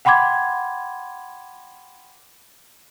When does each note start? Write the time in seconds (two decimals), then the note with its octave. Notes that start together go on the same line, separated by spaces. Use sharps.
0.05 F#5 G5 B5 C6 D6 G#6